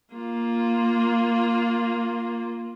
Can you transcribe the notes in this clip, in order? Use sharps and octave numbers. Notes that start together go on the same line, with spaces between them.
A#3 F4